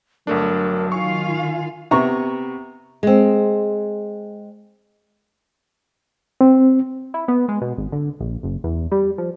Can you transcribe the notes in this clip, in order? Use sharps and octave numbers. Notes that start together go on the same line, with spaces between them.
G1 F#3 A3 D4 A#4
D#3 F4 F5 G#5 C#6
C3 B3 A#5 C#6
G#3 C4
C4
E4
B3
G#3
B2
G#1
D3
A#1
F#1
E2
G3
F3